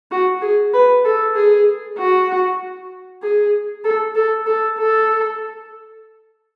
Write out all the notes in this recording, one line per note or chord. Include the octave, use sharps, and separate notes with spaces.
F#4
G#4
B4
A4
G#4
F#4
G#4
A4
A4
A4
A4